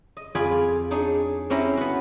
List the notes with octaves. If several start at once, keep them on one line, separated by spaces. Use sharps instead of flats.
D#5
F2 F4 G#4 D5 G#5 B5
D4 D#4 G#4 C#5
C4 C#4 E4 G4 A#5
B3 F#4